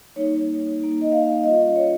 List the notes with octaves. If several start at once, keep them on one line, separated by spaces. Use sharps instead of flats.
G3 A#3 D#4 C#5
A#3 D#4
D#5
F5
F5
G3 C#4 F4 D#5
D#5
C#5